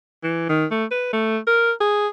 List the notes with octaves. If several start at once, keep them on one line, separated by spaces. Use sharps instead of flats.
E3
D#3
A3
B4
A3
A#4
G#4